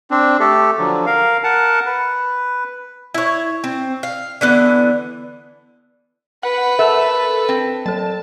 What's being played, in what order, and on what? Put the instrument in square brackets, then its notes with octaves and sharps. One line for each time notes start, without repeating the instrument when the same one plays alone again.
[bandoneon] C4 D4
A3 G4 A4
D3 F3 F#3
A#4 F5
A#4 F#5 A5
B4
[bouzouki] E4 C#5
C4
F5
D3 E3 B3
[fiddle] B4 [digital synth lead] F#5
[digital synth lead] A4 [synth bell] A#4 A5 [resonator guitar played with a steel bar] E5
[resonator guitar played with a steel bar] C4
[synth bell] F#3 A4 [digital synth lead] A5